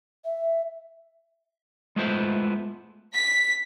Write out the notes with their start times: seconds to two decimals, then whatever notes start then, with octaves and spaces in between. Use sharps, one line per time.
0.25 E5
1.96 G#3 A3 B3 E4 F4 C5
3.13 B6